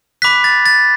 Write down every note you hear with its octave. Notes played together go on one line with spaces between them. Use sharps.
B5 D6 F#6 B6
A6
A6